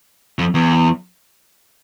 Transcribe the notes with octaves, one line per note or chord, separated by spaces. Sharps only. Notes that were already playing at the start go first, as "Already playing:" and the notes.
F2
E2